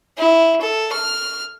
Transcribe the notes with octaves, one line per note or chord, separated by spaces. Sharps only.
E4
A4
F6